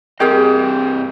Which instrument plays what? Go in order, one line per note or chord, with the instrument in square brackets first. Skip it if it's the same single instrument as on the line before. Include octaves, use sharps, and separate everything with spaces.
[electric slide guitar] G2 C4 D#5 [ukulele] G4 G#4 A#4